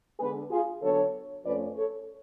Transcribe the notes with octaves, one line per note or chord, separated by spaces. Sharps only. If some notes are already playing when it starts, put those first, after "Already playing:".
D3 G#3 B3 D4 G#4 B4
F4 G#4
D3 F#3 B3 D4 A4 C#5
F2 F3 A3 C#4 B4 D5
A4 C#5